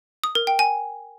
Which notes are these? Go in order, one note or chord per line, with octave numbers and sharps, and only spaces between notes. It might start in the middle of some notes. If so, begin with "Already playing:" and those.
D#6
A#4
G5
G#5